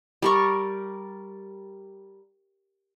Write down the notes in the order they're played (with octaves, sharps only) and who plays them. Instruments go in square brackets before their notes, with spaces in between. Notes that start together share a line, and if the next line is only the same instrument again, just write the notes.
[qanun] G3 A#4 C#6